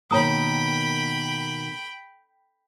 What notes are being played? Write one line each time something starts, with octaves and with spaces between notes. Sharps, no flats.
B2 D#3 A#3 C#5 G5 A#5 B5 D#6